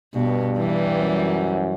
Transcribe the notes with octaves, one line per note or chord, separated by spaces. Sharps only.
G2 B2
E3 G3
F#2